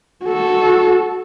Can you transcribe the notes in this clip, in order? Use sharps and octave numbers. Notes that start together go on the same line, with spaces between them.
F#4 A4